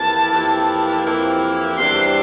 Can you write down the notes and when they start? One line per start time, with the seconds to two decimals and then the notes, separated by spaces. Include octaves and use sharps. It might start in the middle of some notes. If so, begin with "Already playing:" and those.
Already playing: F2 E3 A#3 E4 G4 A5
0.33 F2 E3 A#3 E4 G4
1.06 F2 E3 A#3 E4 G4
1.77 E2 C3 E3 G3 D4 C6